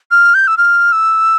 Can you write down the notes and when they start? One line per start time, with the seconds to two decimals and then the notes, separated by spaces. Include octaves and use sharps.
0.11 F6
0.35 G6
0.47 E6
0.58 F6
0.92 E6